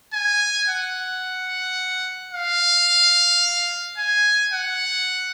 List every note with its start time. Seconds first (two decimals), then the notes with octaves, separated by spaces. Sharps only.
0.13 G#5
0.68 F#5
2.33 F5
3.98 G#5
4.53 F#5